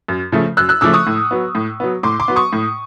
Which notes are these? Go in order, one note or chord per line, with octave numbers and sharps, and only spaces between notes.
F#2
C#3 F3 A3
F#2 E6 F#6
E6 F#6
C#3 F3 A3 D6 E6
C#6 D#6
A2
F#3 B3
A2
F#3 B3
A2 C6 D6
C6 D6
F#3 B3
C#6 D#6
A2